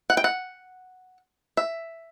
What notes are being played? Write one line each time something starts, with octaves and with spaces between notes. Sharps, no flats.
F#5
G5
F#5
E5